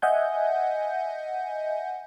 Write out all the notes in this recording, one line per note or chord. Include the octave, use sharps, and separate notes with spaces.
D#5 E5 F#5 G#5 G6